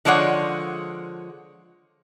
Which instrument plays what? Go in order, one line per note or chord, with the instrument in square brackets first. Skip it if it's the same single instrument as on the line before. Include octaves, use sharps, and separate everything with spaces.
[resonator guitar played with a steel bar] D3 F3 G#3 C#5 D5 F#5